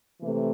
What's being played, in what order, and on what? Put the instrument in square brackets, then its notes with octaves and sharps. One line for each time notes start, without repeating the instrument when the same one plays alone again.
[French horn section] C3 E3 A3